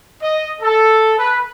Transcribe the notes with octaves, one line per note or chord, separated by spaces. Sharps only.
D#5
A4
B4